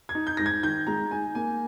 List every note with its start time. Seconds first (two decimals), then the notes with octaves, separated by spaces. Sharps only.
0.09 G#6
0.15 D#4
0.27 G6
0.37 G#2 A#6
0.46 G#6
0.63 D#3 G6
0.87 G#3 A#5
1.11 D#4 G#5
1.35 A#3 G#5